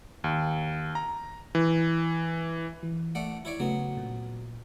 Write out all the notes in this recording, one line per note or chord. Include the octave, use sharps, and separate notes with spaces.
D#2
A#5
E3
E3
A3 D5 F#5
E4 C#5 D5
C#3 F#3 A3 B3
A#2